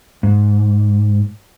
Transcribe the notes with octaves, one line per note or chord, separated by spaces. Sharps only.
G#2